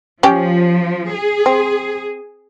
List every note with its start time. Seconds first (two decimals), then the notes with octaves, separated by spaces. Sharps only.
0.23 F3 C#4 G4 G5
1.12 G#4
1.46 C4